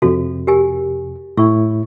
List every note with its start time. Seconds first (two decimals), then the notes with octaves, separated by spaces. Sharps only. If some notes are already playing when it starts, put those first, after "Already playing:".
0.02 F2 C3 F#4 A4
0.47 G4 A#4 G#5
1.37 A2 E4 C#6